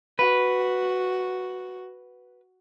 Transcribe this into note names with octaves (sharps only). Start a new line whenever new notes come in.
F#4 B4